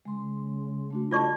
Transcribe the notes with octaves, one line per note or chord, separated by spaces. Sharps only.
C#3 G#3 C6
A3 D4 F#4
F4 A4 D5 D#5 A5 C#6